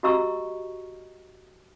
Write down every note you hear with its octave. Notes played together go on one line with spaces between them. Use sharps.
F#4 G4 D#5 A#5 C#6 E6